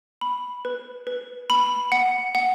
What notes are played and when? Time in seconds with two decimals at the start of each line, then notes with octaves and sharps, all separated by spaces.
0.21 B5
0.65 B4
1.07 B4
1.50 B5
1.92 F#5
2.35 F#5